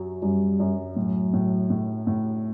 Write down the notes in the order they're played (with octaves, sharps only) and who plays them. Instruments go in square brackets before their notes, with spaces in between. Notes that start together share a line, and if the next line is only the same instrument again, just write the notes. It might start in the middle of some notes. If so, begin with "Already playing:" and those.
Already playing: [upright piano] F#2 F#3
[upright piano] F#2 [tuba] G3
[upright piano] F#2
[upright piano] A2 [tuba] F#3
[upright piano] A2
A2
A2